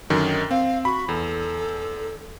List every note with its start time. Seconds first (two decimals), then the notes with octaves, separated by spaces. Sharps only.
0.10 F#2 D3 D#3
0.51 C4 F5
0.85 F#4 B5
1.09 E2 A4